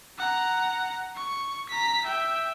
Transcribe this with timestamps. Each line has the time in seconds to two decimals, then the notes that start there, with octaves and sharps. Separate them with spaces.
0.19 F#5 A#5
1.16 C#6
1.69 A#5 B6
2.05 E5 G5